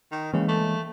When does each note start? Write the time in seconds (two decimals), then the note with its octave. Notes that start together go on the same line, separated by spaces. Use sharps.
0.12 D#3
0.33 C#3 E3 G#3 A#3
0.48 A3